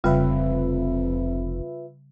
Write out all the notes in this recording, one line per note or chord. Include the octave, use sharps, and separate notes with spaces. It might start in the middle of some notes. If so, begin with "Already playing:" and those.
F1 F2 C#3 G3 F4 B4 E5